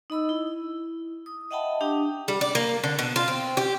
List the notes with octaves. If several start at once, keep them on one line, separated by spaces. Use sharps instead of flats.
D#4 D#5 B5 E6
E4
D#6
D#5 E5 F#5 G5 A5 B5
D4 G4 G5 D#6
G3
D5
A#3
D3
B2
F4
C4
G4